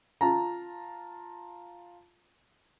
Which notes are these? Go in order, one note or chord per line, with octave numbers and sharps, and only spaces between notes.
F4 A5 A#5